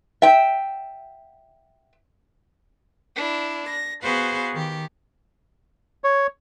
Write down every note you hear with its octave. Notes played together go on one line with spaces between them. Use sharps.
E5 G5
D4 E4
A#6
B3 F#4 G#4 B4 C5 F5
D#3 G4
C#5